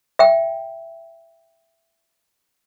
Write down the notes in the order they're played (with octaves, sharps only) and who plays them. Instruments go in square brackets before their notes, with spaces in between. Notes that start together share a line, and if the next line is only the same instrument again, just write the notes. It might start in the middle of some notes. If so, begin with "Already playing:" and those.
[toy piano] E5 G5